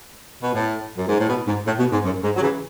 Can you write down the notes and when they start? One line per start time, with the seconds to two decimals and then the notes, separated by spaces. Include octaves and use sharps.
0.42 B2
0.54 A2
0.97 F#2
1.08 G#2
1.19 A2
1.29 B2
1.47 G#2
1.66 A2
1.79 B2
1.92 G#2
2.04 F#2
2.23 G#2
2.36 F#3
2.41 C#3 E3